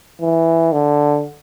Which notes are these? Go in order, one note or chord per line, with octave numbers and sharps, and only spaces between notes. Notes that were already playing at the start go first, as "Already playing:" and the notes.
E3
D3